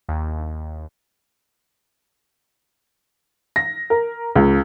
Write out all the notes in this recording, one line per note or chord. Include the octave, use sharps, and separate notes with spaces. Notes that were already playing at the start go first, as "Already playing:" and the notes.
D#2
A#6
A#4
C#2